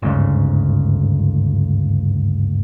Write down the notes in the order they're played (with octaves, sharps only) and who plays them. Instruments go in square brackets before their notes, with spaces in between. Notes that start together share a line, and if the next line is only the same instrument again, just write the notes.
[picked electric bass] G1 D2 G#2 C#3